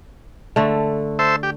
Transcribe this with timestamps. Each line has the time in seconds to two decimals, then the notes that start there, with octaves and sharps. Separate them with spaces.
0.56 D3 A3
1.19 A4 C5 E5
1.43 G4